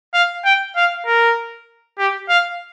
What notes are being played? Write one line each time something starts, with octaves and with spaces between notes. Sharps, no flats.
F5
G5
F5
A#4
G4
F5